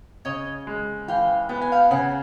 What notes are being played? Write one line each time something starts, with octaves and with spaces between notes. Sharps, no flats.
C#3 C#5 D#5
G#3
E3 F5 G5
B3 G5
G#5
F5 G5
C#3 F#5 G#5